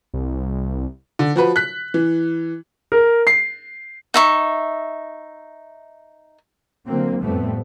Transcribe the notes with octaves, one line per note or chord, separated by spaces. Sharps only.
C2
D3
F3 F#4 B4
F#6 B6
E3
A#4
C7
D#4 E5 C#6
D3 F#3 A#3 C4
F2 A2 G3 A3 B3 C4